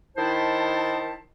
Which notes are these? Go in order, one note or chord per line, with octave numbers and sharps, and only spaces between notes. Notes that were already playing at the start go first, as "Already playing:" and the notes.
D#3 E4 C5 A5